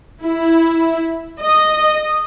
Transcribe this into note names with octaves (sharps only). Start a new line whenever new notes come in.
E4
D#5